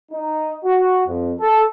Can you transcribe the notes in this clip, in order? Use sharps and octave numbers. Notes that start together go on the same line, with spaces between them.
D#4
F#4
F2
A4